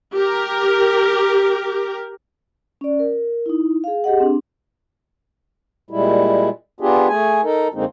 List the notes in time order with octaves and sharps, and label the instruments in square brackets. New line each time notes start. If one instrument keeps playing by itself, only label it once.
[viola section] G4 A#4
[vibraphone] C#4 D5
A#4
D#4 E4
G#4 F5
G4 G#4 D#5 F#5
C4 D4
[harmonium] A#2 G3 G#3 E4
B3 D4 F4 G4 G#4
A3 G#4 G#5
D#4 A4 A#4
F#2 D3 G#3 A#3 C4 D#4